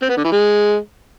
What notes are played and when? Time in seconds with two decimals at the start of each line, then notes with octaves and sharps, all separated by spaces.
0.02 C4
0.09 B3
0.17 D3
0.24 E3
0.32 G#3